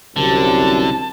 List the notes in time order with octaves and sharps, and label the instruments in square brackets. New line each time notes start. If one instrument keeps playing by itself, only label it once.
[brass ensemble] C2 [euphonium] F#2 [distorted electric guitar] D3 [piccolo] A5